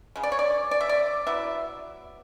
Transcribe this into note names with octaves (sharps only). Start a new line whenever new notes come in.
C#3 G#3
D5
C#5
D5
D5
E5
D5
F#3 B3 E4 E5